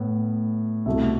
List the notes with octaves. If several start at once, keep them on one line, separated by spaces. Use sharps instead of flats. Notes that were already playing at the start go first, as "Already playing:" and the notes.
Already playing: A2 B3
C2 B2 A3 E4 E5